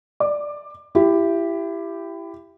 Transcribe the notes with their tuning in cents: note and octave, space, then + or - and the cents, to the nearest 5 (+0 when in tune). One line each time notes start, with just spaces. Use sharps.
D5 +0 D6 +20
E4 +25 G4 +0